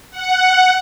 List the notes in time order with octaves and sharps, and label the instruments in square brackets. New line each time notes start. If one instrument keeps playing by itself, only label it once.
[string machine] F#5